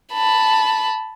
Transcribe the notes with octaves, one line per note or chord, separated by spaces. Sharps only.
A5 B5